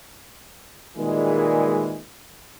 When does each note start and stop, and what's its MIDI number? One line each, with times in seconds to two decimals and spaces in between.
0.97 1.99 46
0.97 1.99 51
0.97 1.99 52
0.97 1.99 55
0.97 1.99 56